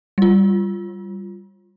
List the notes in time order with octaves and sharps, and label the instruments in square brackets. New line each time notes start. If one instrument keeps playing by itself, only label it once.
[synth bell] G3 F4